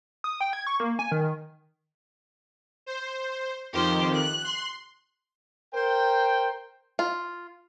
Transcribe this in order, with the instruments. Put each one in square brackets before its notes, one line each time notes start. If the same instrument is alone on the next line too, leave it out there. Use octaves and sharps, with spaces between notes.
[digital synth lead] D#6
G5
G#6
C#6
A#3
G#5
D#3
[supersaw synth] C5
[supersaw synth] F2 D#3 F3 [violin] G4 C5
[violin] F#6
[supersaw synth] C6
[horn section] A#4 C5 G5
[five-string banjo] F4